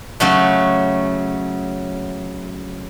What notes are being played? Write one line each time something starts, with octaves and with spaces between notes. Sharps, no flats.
C#3 F#3 A3